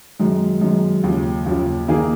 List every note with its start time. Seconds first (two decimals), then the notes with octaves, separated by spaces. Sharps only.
0.20 F#2 D#3 G#3
0.61 F#2 D#3 G#3
1.04 D#2 C#3 F3
1.46 D#2 C#3 F3
1.88 D#3 A#3 D#4 G#4